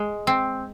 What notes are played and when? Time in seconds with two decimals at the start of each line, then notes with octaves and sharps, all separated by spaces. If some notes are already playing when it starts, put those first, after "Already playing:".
Already playing: G#3
0.27 C4